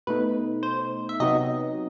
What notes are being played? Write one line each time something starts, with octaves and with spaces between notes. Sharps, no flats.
B2 A3 D#4 B4
C5
E5
C3 F#3 B3 D#4 D#5